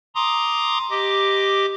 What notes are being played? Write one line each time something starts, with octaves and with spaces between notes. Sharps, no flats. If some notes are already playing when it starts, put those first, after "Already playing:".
A#5 C6 D6 D#6
G4 D#5 D6